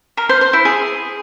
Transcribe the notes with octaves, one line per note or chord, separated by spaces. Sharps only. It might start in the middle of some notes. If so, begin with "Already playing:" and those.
A#4
C5
C5
E4
G#4